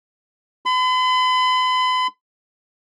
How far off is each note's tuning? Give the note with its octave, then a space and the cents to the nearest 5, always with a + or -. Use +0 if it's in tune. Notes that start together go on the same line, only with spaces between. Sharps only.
B5 +45